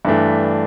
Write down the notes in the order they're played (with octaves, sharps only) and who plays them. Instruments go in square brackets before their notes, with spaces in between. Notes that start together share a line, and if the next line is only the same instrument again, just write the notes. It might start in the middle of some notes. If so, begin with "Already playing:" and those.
[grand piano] G2 E3 A3 D4